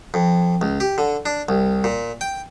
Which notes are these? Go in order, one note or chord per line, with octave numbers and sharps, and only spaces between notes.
F2
C#2
G4
D3
D4
C2
A#2
G5